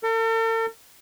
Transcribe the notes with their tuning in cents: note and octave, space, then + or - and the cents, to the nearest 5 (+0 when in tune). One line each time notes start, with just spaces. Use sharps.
A4 +45